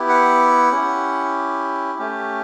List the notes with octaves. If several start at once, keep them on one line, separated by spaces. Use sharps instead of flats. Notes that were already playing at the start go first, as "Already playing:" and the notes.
Already playing: B3 E4 G4
F#5
C#4 E4 G4
A3 C#4 G4